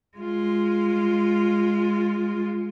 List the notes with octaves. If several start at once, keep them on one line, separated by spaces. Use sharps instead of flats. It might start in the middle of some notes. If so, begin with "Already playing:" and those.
G#3 F4